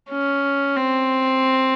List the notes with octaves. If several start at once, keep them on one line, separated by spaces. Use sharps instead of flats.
C#4
C4